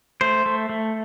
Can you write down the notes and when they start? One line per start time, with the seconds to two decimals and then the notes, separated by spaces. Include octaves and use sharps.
0.21 A3 C5
0.46 A3
0.70 A3